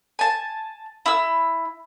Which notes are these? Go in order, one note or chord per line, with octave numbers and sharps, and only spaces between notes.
G#5 A5
E4 E6